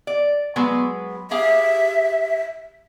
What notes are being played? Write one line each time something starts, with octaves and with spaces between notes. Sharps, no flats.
D5
F#3 G#3 B3
G4 G#4 E5 F5